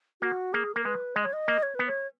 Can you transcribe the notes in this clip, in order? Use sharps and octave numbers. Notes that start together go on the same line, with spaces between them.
A#3 F#4
A#3 G#4
A#3 A#4
G#3 B4
G#3 D#5
C#5
D#5
A#3
C#5
B3 B4
C#5